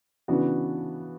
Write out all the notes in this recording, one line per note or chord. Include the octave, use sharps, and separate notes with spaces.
C#3 E3 B3 D4 F#4